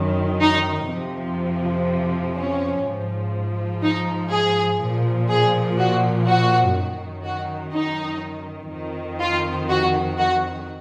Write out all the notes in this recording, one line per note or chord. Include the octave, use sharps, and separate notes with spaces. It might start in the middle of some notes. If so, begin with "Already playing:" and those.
Already playing: F#2 D#3
D#4
F2 C3 F3
C#4
G#2 F3
D#4
G#4
A#2 F3
G#4
F#4
F#4
F#2 D#3
F#4
D#4
F2 D#3
F4
F#4
F#4